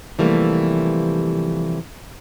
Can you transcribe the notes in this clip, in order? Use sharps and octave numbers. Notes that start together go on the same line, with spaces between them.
C3 E3 F3 G3 A3 A#3